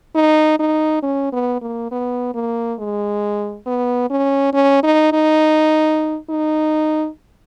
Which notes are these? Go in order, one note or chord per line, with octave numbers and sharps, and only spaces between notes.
D#4
D#4
C#4
B3
A#3
B3
A#3
G#3
B3
C#4
C#4
D#4
D#4
D#4